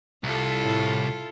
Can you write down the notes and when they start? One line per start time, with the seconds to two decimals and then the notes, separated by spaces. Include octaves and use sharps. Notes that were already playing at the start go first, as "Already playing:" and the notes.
0.24 C2 E4 F4 A4
0.63 A2